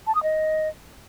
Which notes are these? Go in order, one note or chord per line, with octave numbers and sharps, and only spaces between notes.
A5
D#6
D#5